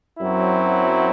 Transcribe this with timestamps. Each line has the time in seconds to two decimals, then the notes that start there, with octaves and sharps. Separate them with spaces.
0.19 F#2 F#3 C4 E4